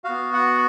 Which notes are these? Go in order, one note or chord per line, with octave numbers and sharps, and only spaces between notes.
B3 F#4 F5
F#5